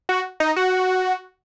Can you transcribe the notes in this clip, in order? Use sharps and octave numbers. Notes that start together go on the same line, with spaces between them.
F#4
D#4
F#4